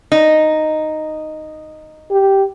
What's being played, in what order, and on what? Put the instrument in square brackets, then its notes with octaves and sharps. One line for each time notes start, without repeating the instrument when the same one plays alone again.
[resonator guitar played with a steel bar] D#4
[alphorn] G4